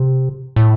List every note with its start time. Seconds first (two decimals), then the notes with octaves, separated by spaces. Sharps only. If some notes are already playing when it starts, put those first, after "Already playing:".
Already playing: C3
0.56 A2